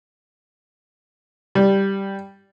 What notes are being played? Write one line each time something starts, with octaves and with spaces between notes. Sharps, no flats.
G3